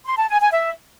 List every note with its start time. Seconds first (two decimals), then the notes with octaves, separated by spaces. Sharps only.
0.06 C6
0.17 A5
0.29 G#5
0.41 G#5
0.52 E5